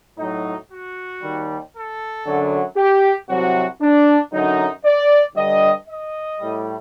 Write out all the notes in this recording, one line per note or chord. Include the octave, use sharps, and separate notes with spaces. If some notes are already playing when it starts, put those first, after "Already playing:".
A2 F#3 D#4
F#4
D#2 D#3 G3
A4
F#2 D3 F#3
G4
C2 C3 F#3 F#4
D4
F#2 D3 F#3 D#4
D5
G2 D3 G3 D#5
D#5
A2 G3